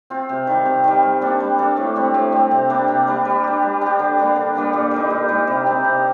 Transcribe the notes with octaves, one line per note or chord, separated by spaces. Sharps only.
C4 F4
C3
D#3 G3
C3
D#3 G3
G3
A#3 D4 A4
G3
A#3 D4 A4
A2
G3 C4
A2
G3 C4
C3
G3 A#3 D4
C3
G3 A#3 D4
G3
D4 G4
G3
D4 G4
D3
G3 A#3 D4
D3
G3 A#3 D4
A#2
G3 A#3 D#4
A#2
G3 A#3 D#4
C3
G3 C4 D#4
C3